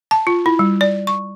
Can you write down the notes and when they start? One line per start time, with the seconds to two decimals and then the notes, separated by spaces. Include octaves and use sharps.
0.11 A5
0.27 F4
0.46 E4
0.59 G3
0.81 D5
1.07 C#6